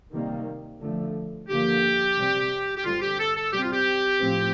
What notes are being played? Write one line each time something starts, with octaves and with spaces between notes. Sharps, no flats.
C3 D#3 G3 A#3
D3 F3 A3
G2 D3 F3 A#3 G4
C3 G3 C4
G4
G2 D3 G3 C4 F4
G4
A4
A4
C3 G3 C4 G4
F4
G4
A2 F3 C4